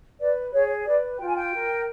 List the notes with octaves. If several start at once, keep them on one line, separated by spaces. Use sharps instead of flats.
B4 D5
G#4 C#5
B4 D5
F4 G5
G#5
G5
A#4